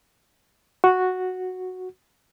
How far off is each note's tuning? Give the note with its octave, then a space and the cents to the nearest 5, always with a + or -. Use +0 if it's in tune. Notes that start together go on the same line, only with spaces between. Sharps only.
F#4 -5